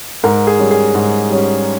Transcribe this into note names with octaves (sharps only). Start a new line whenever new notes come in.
G#2 A#4
G#4
G3 C#4
G#4
G#2
G3 C#4